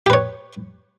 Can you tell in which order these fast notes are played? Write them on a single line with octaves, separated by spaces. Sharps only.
G4 B4 C#5